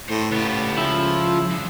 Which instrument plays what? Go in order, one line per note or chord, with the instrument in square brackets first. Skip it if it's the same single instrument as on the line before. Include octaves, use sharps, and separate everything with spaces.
[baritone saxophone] A2 [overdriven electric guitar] C5 C#5
[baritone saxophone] A2 [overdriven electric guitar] C#3 [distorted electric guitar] B3 G4
[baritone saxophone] C#2 [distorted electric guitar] F3 [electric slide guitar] E4
[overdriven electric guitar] E3 D4